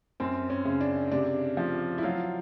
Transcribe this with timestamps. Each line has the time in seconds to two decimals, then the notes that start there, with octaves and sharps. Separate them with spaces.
0.20 F#2 C4
0.50 C#4
0.65 C#3
0.81 D4
1.12 C3 D4
1.57 F3
1.98 E4
2.03 F#3 F4